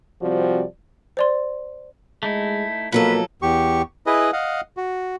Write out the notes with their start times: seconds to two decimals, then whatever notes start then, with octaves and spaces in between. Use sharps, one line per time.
0.22 C3 F3 G3 C4 F#4 D5
1.17 C5 D5 C6
2.23 G#3 A3 D#4 E4
2.92 B2 F3 F#3 A#3 A4 B4
3.42 E2 G4 C#6
4.06 E4 G#4 B4 D#5
4.33 D#5 F5 F#5
4.77 F#4